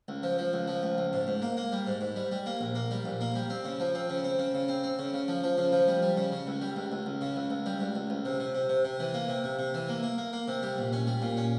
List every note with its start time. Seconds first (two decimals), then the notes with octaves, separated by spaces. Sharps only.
0.08 C#2
0.23 F3
0.38 F3
0.53 C#2
0.68 F3
0.83 C#2
0.98 C#2
1.13 G#2
1.27 G#2
1.42 A#3
1.57 A#3
1.72 G3
1.87 G#2
2.01 G#2
2.16 G3
2.32 G3
2.46 A#3
2.61 A#1
2.75 A#3
2.91 G3
3.05 A#1
3.21 A#3
3.35 G3
3.50 C4
3.65 C#3
3.80 F3
3.95 C4
4.10 C#3
4.24 C4
4.39 C#3
4.54 C#3
4.68 C4
4.83 C4
4.99 C#3
5.14 C#3
5.28 F3
5.43 F3
5.58 C#3
5.72 F3
5.88 G3
6.02 G3
6.17 C#3
6.32 C#3
6.47 C#2
6.62 G3
6.76 C#2
6.92 C#2
7.06 C#2
7.21 C#3
7.36 C#2
7.50 C#2
7.66 G3
7.80 C#2
7.96 C#2
8.10 C#2
8.25 C3
8.40 C3
8.55 C3
8.69 C3
8.85 C3
9.00 E3
9.14 A#3
9.29 C3
9.44 C3
9.59 C3
9.74 E3
9.89 A#3
10.03 A#3
10.18 A#3
10.33 A#3
10.48 C3
10.63 G3
10.78 A#1
10.93 C#4
11.07 G3
11.22 A#2
11.37 C#4